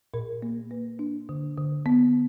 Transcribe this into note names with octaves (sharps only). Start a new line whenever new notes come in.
A#2 A#4
A#3
A#3 B4
D4
D3
D3
B3